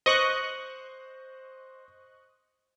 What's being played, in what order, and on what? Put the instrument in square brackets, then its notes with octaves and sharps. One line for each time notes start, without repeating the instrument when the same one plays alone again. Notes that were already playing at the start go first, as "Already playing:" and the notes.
[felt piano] C5 [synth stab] D#5 C#6 F#6